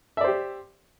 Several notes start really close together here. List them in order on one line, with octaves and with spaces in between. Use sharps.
E5 D5 C5 G4